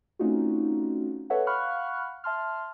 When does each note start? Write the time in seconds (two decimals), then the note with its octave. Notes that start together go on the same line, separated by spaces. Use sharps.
0.19 A3 C4 C#4 D#4 F4 F#4
1.30 A4 B4 C#5 E5 F#5
1.47 F5 F#5 B5 C#6 F6 F#6
2.24 E5 A5 C6 F6